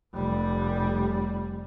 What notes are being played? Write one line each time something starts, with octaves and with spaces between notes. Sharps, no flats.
F1 G3